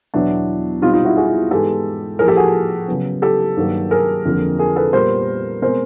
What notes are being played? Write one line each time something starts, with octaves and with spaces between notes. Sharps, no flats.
E2 B2 F#3 B3 D4 E4
B2 G3 C4 D#4 F4
D#4 F4
E4 F#4
F#4 G#4
G#2 E3 G#3 B3 G4 A4
A2 F3 A#3 G#4 A#4
G4 A4
F#4 G#4
C#3 F#3 B3
G4 A4
G2 D#3 F#3 A#3
G#4 A#4
F2 D3 F3 A#3
G#4 A#4
A4 B4
A#2 G3 B3 A#4 C5
B2 G#3 C4 A#4 C5